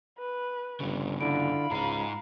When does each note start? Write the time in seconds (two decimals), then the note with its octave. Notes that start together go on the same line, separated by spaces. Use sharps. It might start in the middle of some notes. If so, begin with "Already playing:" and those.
0.19 B4
0.80 G1 G2 C#3
1.21 D3 E4 F4 B5 D7
1.71 C#2 G#2 D#4 A#5 C7